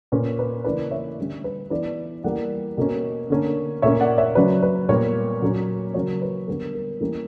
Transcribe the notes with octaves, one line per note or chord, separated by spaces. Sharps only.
A#2 A#3 C#4 B4
B4
C#3 E3 A#3 B4 D5
C#5 E5
D3 G3 C#4
B4
E3 B3 B4 D5
E3 G3 A#3 D5 F#5
B2 A#3 C#4
D3 A#3 C#4
A#2 A#3 C#4 C#5 E5
D5 F#5
C#5 E5
C#3 F#3 C#4 B4 D5
B4
A#2 G3 B3 A#4 C#5
A#2 F#3 A#3 C#4
C#3 F#3 C#4 A#4 C#5
B4
D3 G3 B3 A#4
A#4
E3 G3 A#3 C#4